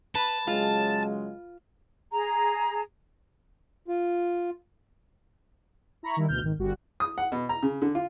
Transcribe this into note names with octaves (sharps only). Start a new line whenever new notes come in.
B4 A5
C#3 F#3 G#3 F4
G#4 A#5
F4
E4 A#5 B5 C#6
D#3 G3 E4
D2 B2 F6 G6
G#1 D#3
G1 G3 F#4
D#6
F#5
B2
A#5
C#3
D3
F4